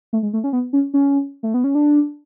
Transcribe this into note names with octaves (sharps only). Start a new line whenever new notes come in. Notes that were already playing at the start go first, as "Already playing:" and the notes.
A3
G#3
A3
C#4
B3
C#4
C#4
A3
B3
C#4
D4